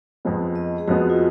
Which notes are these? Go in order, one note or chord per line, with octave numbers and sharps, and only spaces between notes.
F2 F3 G#3 B3
D#5
G#4
F2 F3 G#3 B3 F#4
F4